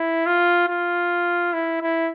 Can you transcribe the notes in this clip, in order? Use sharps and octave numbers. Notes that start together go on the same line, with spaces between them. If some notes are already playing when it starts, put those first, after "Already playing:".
Already playing: E4
F4
F4
E4
E4